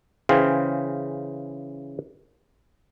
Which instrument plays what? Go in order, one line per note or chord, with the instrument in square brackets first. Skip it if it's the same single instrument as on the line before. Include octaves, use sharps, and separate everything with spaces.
[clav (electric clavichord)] C#3 E3 G#4 C5 F5 G5